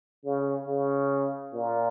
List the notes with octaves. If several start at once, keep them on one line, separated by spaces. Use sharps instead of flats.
C#3
C#3
A#2